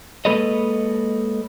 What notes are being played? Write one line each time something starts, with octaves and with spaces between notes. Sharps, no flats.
G#3 A#3 A4 B4 C#5 D#5